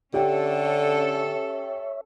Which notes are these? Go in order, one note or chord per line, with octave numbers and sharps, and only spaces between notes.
D3 C#4 G4 A4 C#5 E5 G5